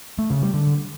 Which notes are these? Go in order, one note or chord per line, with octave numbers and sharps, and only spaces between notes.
A3
C#3
G3
D3